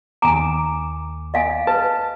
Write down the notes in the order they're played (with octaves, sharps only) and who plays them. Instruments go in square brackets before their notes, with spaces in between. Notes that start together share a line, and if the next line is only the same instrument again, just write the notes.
[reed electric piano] D#2 D6 [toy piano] G#5 A#5
[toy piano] D#5 F5 G#5
[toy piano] B4 [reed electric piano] A5